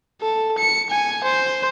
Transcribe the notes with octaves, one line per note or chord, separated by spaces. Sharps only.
A4
C#7
G#5
C5